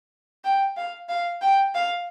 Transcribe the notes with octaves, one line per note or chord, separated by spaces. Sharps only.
G5
F5
F5
G5
F5